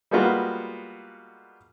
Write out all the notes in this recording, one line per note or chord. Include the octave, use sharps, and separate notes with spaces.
G3 G#3 A#3 B3 F4 F#4